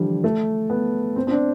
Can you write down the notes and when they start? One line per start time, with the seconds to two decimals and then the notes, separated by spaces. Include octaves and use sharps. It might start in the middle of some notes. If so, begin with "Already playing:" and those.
Already playing: D3 E3 F3 G3
0.24 A3
0.70 B3
1.16 C4
1.27 C4
1.31 D4